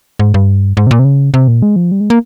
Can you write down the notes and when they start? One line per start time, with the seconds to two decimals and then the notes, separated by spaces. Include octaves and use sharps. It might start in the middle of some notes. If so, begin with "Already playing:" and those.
0.19 G#2
0.34 G2
0.77 G#2
0.87 C3
0.91 A#2
0.99 C3
1.05 C#3
1.34 C3
1.48 A#2
1.62 G#3
1.76 F3
1.92 G3
2.01 G#3
2.10 A#3